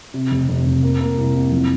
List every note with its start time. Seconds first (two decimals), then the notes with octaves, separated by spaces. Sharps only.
0.14 C3
0.31 F1
0.48 F1
0.66 F1
0.83 A#3
1.00 A#3
1.18 C2
1.35 C2
1.52 F2